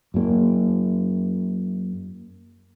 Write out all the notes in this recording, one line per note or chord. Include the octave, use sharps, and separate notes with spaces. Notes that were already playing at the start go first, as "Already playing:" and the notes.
F#2 A#3